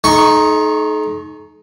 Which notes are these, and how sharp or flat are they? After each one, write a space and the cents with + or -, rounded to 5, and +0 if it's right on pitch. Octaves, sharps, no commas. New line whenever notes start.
A3 -45 D#4 +0 C#6 +0